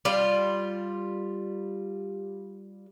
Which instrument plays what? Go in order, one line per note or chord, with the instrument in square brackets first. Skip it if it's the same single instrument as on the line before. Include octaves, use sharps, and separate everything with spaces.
[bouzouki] G3 F4